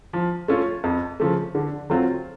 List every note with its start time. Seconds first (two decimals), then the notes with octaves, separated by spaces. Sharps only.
0.13 F3
0.48 A3 C#4 F4
0.84 F2
1.20 C#3 F3 A3
1.55 D3
1.90 F#3 A3 C4 F4